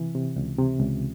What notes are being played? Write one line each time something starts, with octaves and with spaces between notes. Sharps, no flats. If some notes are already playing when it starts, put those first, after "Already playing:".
Already playing: C3 E3
C3
C#2
C3
C#2